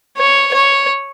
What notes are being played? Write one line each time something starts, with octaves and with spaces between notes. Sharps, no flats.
C#5
C#5